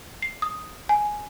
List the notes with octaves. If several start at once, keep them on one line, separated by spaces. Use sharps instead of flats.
C7
D#6
G#5